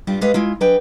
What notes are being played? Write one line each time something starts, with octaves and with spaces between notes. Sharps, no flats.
G2 G3 F4
G#3 G4 B4 D#5 F5
G#3 E4 F4
F#3 D4 B4 D#5 G5 G#5